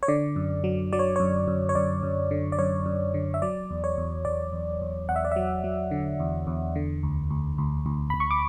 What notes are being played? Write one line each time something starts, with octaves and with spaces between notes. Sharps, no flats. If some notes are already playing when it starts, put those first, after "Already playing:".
C#5
D3 D5
F#2
F#3
F#3 D5
C#5
F#2 C#5
F#2
C#5
F#2 D5
F#2
D3
D5
F#2 C#5
F#2
D3
E5
F#3 D5
E2
C#5
E2
E2 D5
E2
E2
E2 F#5
E5
D5
F#3 E5
F#3
D3
E2
E2
D3
D2
D2
D2
D2
D2 B5
C#6
D6